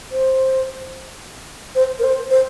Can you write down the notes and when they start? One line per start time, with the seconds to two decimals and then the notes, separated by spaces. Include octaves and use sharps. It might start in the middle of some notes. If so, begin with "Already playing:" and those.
0.12 C5
1.75 C5
1.99 A#4
2.04 C5
2.30 C5